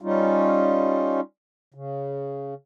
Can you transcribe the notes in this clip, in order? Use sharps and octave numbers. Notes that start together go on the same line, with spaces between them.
G3 C#4 D#4 F4
C#3